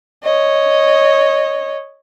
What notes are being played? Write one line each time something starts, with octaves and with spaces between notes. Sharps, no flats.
C#5 D#5